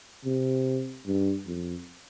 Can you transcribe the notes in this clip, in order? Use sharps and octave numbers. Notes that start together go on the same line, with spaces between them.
C3
G2
F2